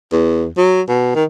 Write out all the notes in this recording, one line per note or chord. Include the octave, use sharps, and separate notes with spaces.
E2
F#3
B2
D#3